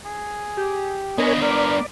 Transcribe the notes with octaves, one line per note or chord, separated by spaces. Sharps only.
G#4
G4
B3 D4 A#4 C#5 D#5 G#5 B5
A#4 D5